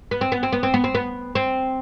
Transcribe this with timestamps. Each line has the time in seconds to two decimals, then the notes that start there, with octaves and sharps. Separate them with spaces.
0.11 B3
0.21 C4
0.32 B3
0.43 C4
0.52 B3
0.63 C4
0.74 B3
0.84 C4
0.95 B3
1.35 C4